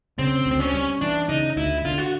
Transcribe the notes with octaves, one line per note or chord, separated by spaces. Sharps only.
C#3 C4
D2
C4
C#4
G3
E3 D4
C#3 D#4
D2 E4
D3 F4
F#4